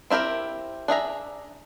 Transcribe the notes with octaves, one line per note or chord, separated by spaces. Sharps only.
C4 E4 G4 A#4 E5
D4 G#4 E5 A#5